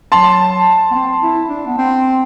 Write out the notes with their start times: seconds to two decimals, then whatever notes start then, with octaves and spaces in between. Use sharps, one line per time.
0.12 F#3 A5 C6
0.91 B3
0.95 C4
1.23 E4
1.49 D4
1.67 B3
1.78 C4